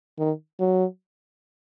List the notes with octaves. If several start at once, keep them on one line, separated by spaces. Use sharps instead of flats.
D#3
F#3